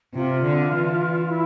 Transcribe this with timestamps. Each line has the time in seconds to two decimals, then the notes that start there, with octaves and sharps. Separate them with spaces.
0.14 C3 F4
0.44 D3
0.73 E3
1.31 E4